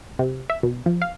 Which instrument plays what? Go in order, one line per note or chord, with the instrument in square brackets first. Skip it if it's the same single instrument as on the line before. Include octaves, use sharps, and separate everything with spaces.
[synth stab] C3
E5
B2
F3
F5